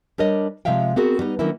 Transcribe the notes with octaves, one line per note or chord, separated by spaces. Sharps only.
G3 D4 A#4 C#5 D#5
C3 F3 G#3 E5 F5 G5
B3 C4 F#4 G#4 A#4
G3 B3 D#4
D#3 F#3 A#3 C#4 D4 E4